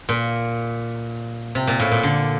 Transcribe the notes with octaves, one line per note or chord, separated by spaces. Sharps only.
A#2
C3
A#2
A2
A#2
D3